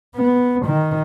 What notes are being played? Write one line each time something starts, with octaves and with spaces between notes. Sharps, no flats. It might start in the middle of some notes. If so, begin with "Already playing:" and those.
B3
D#3